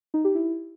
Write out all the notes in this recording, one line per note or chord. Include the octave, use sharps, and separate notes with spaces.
D#4
G4
E4